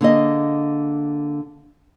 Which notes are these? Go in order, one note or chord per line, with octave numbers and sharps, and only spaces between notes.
D3 A#3 G#4 D#5